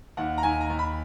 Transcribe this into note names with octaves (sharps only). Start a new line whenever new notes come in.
D#2 F#5
A#5
D#2 G#5
A#5
D#2
B5